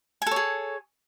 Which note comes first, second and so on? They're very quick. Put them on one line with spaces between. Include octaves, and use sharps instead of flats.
G#5 A4 C#5 G#4